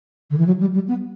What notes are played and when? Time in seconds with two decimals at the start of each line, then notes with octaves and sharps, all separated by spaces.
0.31 D3
0.38 E3
0.47 F#3
0.60 G3
0.74 G3
0.88 B3